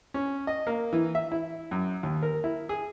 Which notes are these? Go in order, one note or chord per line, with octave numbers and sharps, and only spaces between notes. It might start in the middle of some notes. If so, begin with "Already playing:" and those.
C#4
D#5
A#3
E3
E5
E4
F#2
D#2
A#4
E4
G#4